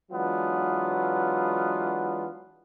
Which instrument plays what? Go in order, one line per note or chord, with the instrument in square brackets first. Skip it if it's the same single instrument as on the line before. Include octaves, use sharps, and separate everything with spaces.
[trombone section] E3 F#3 G#3 B3 D4 F4